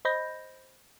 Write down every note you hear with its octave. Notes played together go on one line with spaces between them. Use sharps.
C5 D#5 B5 G6 A#6